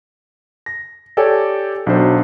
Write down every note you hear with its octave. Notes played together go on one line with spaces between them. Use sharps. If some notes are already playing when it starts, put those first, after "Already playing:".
A#6
G4 A4 C#5 D5 G5 G#5
B1 F#3 D4 C5